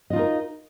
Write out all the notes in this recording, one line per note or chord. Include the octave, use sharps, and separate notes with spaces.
D#4 F4 A#4 D#5